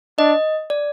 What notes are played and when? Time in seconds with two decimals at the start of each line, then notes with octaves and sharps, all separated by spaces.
0.19 D4 D#5
0.70 D5